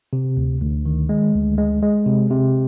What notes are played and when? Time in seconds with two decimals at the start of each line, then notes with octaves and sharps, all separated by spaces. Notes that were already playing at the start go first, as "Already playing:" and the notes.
0.13 C3
0.37 D2
0.61 D2
0.86 D#3
1.09 G#3
1.34 D2
1.58 G#3
1.82 G#3
2.06 C3
2.30 C3